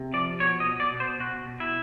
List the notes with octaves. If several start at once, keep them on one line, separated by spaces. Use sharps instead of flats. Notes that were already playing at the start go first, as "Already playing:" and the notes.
Already playing: C3
F3 D5
B2 C#5
D#5
B2
D5
B2
C5
B2 F#4
B2
E4